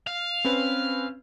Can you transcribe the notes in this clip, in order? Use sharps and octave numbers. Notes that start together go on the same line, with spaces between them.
F5
C4 C#4 B4